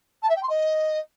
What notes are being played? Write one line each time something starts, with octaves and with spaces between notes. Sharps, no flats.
A5
E5
G5
C6
D#5